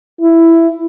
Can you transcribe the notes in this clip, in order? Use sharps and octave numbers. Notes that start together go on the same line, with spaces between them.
E4